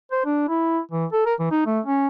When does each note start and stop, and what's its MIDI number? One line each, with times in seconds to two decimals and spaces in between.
0.12 0.22 72
0.25 0.47 62
0.49 0.79 64
0.92 1.06 52
1.12 1.22 69
1.26 1.34 70
1.39 1.47 52
1.51 1.63 63
1.66 1.80 57
1.86 2.08 61